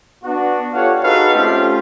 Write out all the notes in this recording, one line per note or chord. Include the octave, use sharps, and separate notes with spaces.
B3 D4 F#4
F4 G4 A4 C#5 F5 F#5
D#4 F#4 G#4 A4 B4 F5
A3 C4 C#4 F4 G4